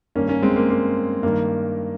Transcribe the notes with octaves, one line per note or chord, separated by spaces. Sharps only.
G2 D#3 A#3 C#4
A#3 C#4
G#3 C4
A#3
A#3
G2 D#3 A#3